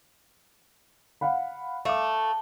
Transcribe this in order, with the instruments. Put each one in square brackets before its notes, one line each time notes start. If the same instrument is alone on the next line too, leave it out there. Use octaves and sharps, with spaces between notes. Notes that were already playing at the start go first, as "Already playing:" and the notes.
[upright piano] F5 F#5 B5
[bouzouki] A3 [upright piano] F5 D6